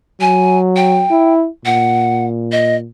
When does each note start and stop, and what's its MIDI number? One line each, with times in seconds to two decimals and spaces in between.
0.21 1.05 54
0.21 0.58 80
0.76 1.33 79
1.11 1.48 64
1.65 2.88 46
1.65 2.26 78
2.52 2.76 75